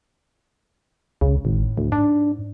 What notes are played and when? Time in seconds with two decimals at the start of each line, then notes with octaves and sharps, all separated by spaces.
1.21 C#2 C#3
1.45 G#1 A2
1.78 D2
1.92 G#2 D4